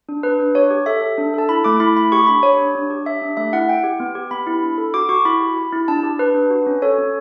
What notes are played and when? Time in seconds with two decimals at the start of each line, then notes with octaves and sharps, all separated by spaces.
0.09 D4
0.23 D4 B4
0.39 D4
0.55 G4 C#5
0.71 G4
0.86 A4 E5
1.02 A4
1.18 D4
1.34 A4 A5
1.49 E4 B5
1.64 A3 D6
1.80 E4 B5
1.96 A3 B5
2.12 G4 C#6
2.27 D4 B5
2.43 G4 C#5
2.58 D4
2.75 D4
2.90 G4
3.05 G4 E5
3.22 D4
3.37 A3 E5
3.53 E4 F#5
3.68 E4 G5
3.84 G4
4.00 B3
4.15 G4
4.31 B3 B5
4.47 E4
4.62 D4
4.78 A4
4.94 F#4 D6
5.09 F#4 C#6
5.25 E4 B5
5.40 G4
5.56 G4
5.73 E4
5.88 D4 A5
6.03 G4
6.19 D4 B4
6.34 D4
6.50 F#4
6.66 C#4
6.82 A4 C#5
6.98 C#4